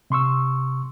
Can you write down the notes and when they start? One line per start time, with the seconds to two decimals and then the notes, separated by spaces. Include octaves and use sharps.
0.10 C3 C6 C#6 E6